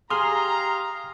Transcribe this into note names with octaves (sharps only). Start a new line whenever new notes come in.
G4 G#4 F5 A#5 C6 D#6 F6